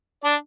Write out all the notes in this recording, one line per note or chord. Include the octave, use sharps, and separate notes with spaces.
D4 D5